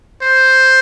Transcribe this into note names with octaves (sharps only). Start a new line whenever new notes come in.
C5